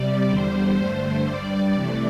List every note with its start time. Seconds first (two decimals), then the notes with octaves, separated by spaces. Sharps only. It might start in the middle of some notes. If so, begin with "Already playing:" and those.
Already playing: C3 G3 D5
0.28 E2 D3 G3 C5
0.77 G2 D3 A3
1.25 G2 G3 D5
1.74 C3 E3 A3